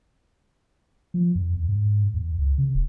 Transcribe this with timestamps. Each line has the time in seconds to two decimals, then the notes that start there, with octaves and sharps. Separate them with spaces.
1.14 F3
1.35 F2
1.54 E2
1.68 G#2
2.14 E2
2.38 C#2
2.58 C#3
2.75 D#1